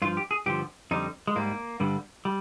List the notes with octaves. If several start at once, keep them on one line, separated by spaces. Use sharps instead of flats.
G2 F3 F4
G4
G#4
G2 D3 F3 G4
F2 D3 G3 D#4
G#3
G#2 G3 A#3
G2 D3 G3
G3